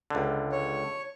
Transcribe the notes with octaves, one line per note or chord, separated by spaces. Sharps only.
C#2 D3
C#5